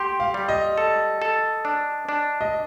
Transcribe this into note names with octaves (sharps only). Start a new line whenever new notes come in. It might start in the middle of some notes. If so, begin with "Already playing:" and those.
Already playing: G4 C6
F5
G3
D#5
A4
A4
D4
D4
D#5